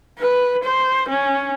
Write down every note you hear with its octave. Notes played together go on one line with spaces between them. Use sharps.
B4
C5
C#4